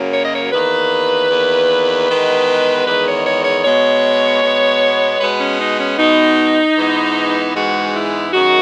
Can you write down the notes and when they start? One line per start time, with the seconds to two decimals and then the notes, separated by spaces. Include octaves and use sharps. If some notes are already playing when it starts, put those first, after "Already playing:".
Already playing: F#2 C#3 F#3 A#3
0.13 C#5
0.24 D#5
0.35 C#5
0.52 E2 D#3 A#3 B4
1.30 E2 D#3 A#3
2.08 E2 D#3 G#3 B3
2.86 E2 D#3 G#3 B3 B4
3.06 C#5
3.26 C#5
3.44 C#5
3.64 B2 G#3 B3 C#5
4.43 B2 G#3 B3
5.20 B2 G#3 B3 B4
5.40 C#4
5.60 D#4
5.80 C#4
5.99 B2 G#3 B3 D#4
6.77 G#2 E3 G#3 B3
7.55 G#2 E3 G#3 B3 F#4
7.95 E4
8.33 F#2 D#3 G#3 F#4